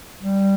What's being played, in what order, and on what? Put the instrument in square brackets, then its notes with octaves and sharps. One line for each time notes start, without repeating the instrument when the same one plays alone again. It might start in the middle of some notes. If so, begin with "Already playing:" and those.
[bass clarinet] G3